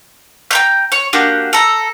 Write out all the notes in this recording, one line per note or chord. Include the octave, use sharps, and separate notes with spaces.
G5 A#5 G6
C#5
A#3 D4 F#4 G4
A4 A#5